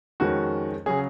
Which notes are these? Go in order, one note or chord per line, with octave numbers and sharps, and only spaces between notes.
F2 D#3 G#3 C#4 F#4
C#3 F#3 C#4 G#4